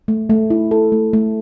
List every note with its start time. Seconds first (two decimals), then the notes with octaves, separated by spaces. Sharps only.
0.08 A3
0.30 A3
0.50 E4
0.71 A4
0.92 A3
1.13 A3